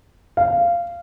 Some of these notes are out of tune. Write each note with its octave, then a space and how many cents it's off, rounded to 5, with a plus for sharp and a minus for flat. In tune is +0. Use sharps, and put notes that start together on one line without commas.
F5 -15